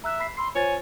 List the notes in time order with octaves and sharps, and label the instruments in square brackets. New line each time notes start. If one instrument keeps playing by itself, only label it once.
[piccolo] E5 [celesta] A#5 E6 F#6
[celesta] B5 B6 C7
[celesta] B5 E6 C7 [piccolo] C6
[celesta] F4 C5 A6 [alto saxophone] C#5 [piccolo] G#5